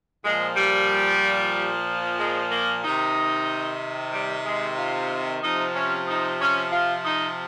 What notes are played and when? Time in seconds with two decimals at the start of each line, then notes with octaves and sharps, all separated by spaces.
0.23 A#2 F3 G#3
0.56 G3
2.18 G#3
2.50 A#3
2.83 C3 D#3 D#4
4.12 G3
4.45 G#3
4.77 F4
5.42 C3 F3 D#4
5.75 C#4
6.08 D#4
6.39 C#4
6.72 F4
7.04 D#4